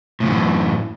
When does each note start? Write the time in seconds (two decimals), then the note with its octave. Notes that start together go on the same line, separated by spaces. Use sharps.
0.20 A2
0.23 C#3
0.25 F3
0.28 F#2
0.31 E3